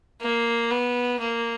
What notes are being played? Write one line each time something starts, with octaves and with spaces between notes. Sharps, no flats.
A#3
B3
A#3